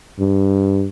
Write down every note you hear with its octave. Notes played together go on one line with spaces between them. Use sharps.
G2